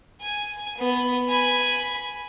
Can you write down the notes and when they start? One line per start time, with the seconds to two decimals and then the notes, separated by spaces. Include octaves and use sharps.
0.20 G#5
0.77 B3
1.28 G#5 B5